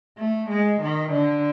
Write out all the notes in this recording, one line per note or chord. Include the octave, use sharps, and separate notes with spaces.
A3
G#3
D#3
D3